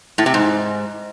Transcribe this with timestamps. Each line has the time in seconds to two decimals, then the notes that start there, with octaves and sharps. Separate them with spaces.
0.18 A2
0.26 C3
0.34 G#2